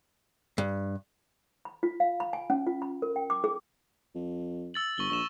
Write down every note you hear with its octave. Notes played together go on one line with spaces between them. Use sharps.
G2
B5
F4
F5
B5
G#5
C#4
F4
B5
A#4
G5
D6
G#4
F2
E6 A6 F#7
G1 C#6 G7
A#1 C#6 E7